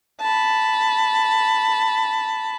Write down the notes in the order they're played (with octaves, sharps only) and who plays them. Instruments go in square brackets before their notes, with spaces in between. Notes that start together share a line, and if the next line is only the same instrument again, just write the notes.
[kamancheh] A5 B5